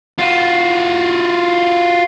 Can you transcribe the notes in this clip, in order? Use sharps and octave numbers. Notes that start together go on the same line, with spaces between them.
F4 F#4